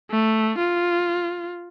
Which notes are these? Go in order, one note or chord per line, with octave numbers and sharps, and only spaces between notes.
A3
F4